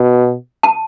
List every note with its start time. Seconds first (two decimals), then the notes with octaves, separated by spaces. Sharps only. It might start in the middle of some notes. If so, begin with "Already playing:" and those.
Already playing: B2
0.63 A5